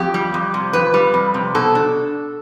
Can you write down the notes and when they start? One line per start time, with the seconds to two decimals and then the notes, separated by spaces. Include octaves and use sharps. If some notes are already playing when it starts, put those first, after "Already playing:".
Already playing: F2 G4
0.14 G3
0.34 F2
0.54 C3
0.73 F2 B4
0.94 G3
1.14 F2
1.34 C3
1.55 B2 A4
1.75 D4